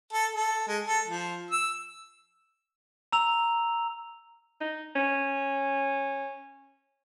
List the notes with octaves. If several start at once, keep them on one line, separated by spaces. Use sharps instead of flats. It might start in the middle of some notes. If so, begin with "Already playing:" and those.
A4
A4
G#3
A4
F3
E6
A#5 E6 F7
D#4
C#4